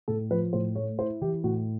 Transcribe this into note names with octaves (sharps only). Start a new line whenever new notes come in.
A2 A4
F3 B4
A2 C5
A3 C#5
E4 C5
E3 G4
A2 F#4